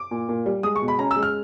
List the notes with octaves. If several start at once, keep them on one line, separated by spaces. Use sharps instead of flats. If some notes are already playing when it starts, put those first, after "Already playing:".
Already playing: D6
A#2
A#2
G3
G#3 D#6
C#6
B2
B5
C#4 A#5
E6
G#3
F6